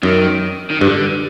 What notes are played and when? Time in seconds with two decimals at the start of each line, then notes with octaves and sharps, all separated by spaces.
0.03 F#2 D#3
0.71 D#3
0.81 G2 D3